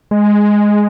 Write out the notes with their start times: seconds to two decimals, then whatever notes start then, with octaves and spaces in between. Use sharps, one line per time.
0.11 G#3